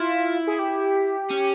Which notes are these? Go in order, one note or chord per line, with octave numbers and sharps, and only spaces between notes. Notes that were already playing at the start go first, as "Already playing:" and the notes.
Already playing: E4 F4
G#4
G4
C#4